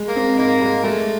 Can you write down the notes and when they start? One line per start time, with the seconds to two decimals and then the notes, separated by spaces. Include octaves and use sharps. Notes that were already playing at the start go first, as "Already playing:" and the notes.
Already playing: G#3
0.08 A#3
0.16 C4
0.38 G#2 A#3
0.61 G#3
0.83 G#3 A3